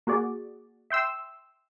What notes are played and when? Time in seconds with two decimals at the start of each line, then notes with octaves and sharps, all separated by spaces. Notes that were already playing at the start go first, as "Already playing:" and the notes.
0.07 A#3 F#4 G#4 D5
0.90 E5 G5 C6 E6